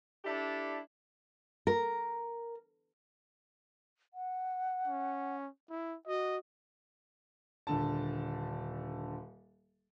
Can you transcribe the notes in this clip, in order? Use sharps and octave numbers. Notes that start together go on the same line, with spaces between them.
D4 E4 G4 A4
A#4
F#5
C#4
E4
F#4 D#5
D#1 D3 A5